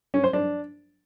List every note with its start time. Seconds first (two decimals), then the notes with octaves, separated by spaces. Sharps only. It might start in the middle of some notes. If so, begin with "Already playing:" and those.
0.14 C#4
0.24 C5
0.33 D4